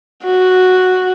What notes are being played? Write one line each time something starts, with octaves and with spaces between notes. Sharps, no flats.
F#4